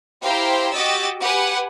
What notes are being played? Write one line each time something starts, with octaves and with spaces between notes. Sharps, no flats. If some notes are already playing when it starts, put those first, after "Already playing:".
E4 G4 C5 F5 G5 A#5
F#4 G4 D#5 D6 E6 A6
G4 B4 F#5 G#5